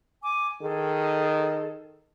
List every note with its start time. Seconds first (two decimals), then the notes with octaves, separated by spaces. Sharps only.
0.22 G#5 D6
0.61 D#3 G#4 A4